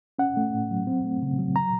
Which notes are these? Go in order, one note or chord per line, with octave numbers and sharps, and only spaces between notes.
C#4 F#5
A3
A2
F#3
C4
A3
C#3
F#3
A#5